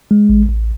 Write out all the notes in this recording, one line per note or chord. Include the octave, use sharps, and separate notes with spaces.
G#3
A1
A1